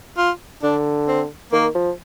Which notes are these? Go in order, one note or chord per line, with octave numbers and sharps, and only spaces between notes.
F4
D3 D4
C4
D#3 A#3
F3